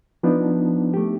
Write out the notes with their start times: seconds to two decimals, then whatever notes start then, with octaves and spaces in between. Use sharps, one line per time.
0.23 F3 B3 D4 D#4
0.94 A3 G4